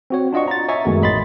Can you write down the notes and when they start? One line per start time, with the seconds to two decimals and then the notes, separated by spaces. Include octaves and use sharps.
0.10 C4 F#4 C#5
0.32 D4 F4 D#5 F#5 C#6
0.48 A#5 A6
0.68 C#5 D#5 E5 G#5 A#5 C#6
0.85 F#2 D#3 G#3 A3 B3 F#4
1.02 A1 D#5 B5 C6 A6